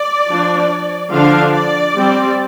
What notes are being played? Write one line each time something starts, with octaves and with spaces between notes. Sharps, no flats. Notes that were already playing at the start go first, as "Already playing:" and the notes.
Already playing: D5
F3 D4
D3 F3 D4 F5
D5
G3 C4